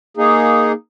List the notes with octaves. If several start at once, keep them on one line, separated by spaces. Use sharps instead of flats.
A#3 D#4 G#4